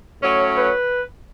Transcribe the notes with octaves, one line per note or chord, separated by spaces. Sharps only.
A2 F#3 C#4 C#5
B4